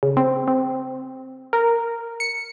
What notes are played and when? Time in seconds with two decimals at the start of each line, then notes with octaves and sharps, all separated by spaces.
0.03 C#3
0.17 C4
0.48 C4
1.53 A#4
2.20 C#7